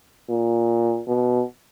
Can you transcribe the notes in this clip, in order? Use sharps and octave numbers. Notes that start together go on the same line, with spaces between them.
A#2
B2